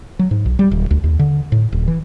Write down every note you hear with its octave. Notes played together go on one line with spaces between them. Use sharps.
F#3
G#2
B1
G3
D#1
D2
D#2
D3
A2
D#1
E3